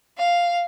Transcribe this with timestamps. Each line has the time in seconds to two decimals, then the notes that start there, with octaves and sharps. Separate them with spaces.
0.18 F5